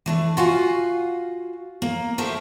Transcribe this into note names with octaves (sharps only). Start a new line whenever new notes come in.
E3 A3 D4
F4 F#4 F5 G#5
A#3
D2 A3 A#4 C5 E5